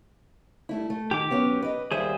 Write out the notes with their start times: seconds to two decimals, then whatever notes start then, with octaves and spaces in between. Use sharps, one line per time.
0.69 G3 A3 E4
0.90 A3
1.11 D#3 G4 D6
1.30 F#3 B3 C#4
1.62 B4 D#5
1.91 D#2 G3 G#4 C5 E5